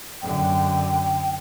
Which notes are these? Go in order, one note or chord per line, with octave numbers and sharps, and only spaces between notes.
F#2 D3 G5